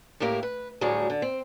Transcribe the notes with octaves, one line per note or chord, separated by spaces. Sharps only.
A2 A#3 G4 A#4 E5
B4
D2 A2 F#3 G3 G#4
D3
C4